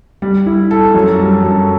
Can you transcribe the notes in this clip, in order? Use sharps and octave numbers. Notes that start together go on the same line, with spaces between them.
G3
E4
A4
F#2
G3
F#2